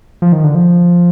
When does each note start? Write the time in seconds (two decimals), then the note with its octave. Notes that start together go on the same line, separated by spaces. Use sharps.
0.22 F3
0.32 D#3
0.44 D3
0.55 F3